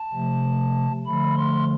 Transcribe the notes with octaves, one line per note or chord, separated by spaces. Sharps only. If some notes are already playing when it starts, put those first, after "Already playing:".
Already playing: A5
C3 F3 A3
D3 F3 A3 B5
C6